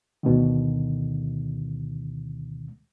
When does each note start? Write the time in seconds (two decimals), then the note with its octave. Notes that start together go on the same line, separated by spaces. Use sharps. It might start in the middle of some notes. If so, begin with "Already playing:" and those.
0.23 D2 B2 D3 D#3